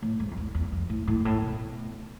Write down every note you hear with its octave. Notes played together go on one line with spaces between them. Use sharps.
A2
G#2
F2
E2
E2
F2
A2
A2
G#2
A2
B2